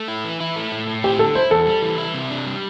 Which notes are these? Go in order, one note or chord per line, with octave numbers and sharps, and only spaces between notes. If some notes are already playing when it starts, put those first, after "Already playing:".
Already playing: A3
E4
E3
E4
A3
A2
A2
C4 G4
D3 A4
E4 C5
E2 A4
G3
E3
E4
C3
D4
G3